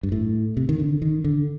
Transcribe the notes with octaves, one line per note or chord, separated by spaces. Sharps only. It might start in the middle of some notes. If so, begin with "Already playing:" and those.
G2
A2
C3
D#3
D3
D#3
D3